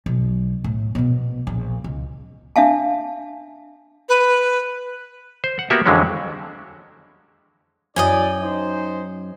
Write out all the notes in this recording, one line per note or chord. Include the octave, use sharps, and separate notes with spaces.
B1
A2
A#1 B2
A#1
C#2
D4 E5 F5 A5
B4
C5
F#5
A#3 B3 F#4 G4 E5
F2 D3 E3 F#3 G#3 C#4
F#2 E4 D5 D#5 G5 G#5
D#4 C5